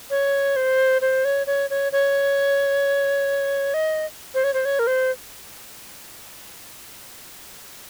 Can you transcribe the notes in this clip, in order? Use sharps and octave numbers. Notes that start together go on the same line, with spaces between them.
C#5
C5
C5
C#5
C#5
C#5
C#5
D#5
C5
C#5
C5
C#5
A#4
C5